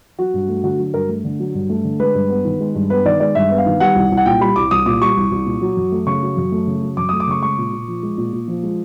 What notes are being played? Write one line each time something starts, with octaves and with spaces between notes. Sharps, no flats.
F#3 F#4
G2
A3
D3 F#4
F#3
G2 A#4
A3
D3
F#3
G2
A3
D3
G#3 B4
G2
B3
D#3
G#3
G2
B3 B4
D#3 D5
G#3 D5
G2 E5
B3
F5
D#3
G3 F#5
C2
C2
F#5
A#2 G5
G3 B5
C2 D6
C2 D#6
A#2 D6
G3 C#6
C2
C2
A#2
F#3
F#2
A3
C#3 C#6
F#3
F#2
A3
C#3
F#3
F#2 D6
A3 D#6
D6
C#3 C#6
G#3 C#6
A#2
A#2
F3
G#3
A#2
A#2
F3
G#3